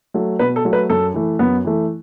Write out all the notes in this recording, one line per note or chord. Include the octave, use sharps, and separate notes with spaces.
F#3 A3
B2 B4
A4
F#3 A3
B4
F#2 A4
E3 A3
F#2 B3
E3 A3